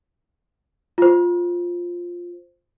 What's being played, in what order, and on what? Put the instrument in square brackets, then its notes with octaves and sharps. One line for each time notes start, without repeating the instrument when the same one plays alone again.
[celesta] F4 C5